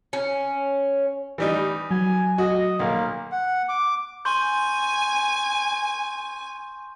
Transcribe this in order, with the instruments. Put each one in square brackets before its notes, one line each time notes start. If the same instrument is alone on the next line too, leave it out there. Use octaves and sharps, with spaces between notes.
[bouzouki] C#4
[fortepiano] E3 G3 D#4
[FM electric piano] F#3 [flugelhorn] G#5
[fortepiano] F#4 [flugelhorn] D#5
[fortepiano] B1 [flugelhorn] A#3
[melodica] F#5
D6
[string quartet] G#5 [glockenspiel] C6 C#6 G6